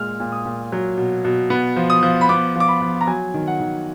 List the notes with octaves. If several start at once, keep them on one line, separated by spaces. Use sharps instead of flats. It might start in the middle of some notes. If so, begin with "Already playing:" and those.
Already playing: A#2 G#3 F6
A#2
D#6
A#2
F#3
B2
B2
B3
F3
D#6
F3
B5
B3 D6
F3 D6
B5
F3
A#5
F#3 G#5
D#3
F#5
D#3